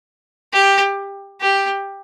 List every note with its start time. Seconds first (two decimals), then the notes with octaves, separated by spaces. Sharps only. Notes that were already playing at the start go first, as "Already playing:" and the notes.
0.53 G4
1.41 G4